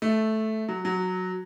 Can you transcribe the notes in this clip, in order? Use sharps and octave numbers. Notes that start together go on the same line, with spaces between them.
A3
F#3
F#3